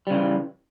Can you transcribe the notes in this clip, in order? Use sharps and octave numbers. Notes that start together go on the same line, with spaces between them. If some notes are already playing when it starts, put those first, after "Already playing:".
C#3 E3 G3